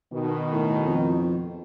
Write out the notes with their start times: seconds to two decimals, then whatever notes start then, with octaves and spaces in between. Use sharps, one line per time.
0.13 B2 D#3
0.52 A2
0.86 F2